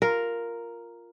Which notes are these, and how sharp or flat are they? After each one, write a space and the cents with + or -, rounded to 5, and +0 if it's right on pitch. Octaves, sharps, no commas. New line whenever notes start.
F4 +0 A#4 +0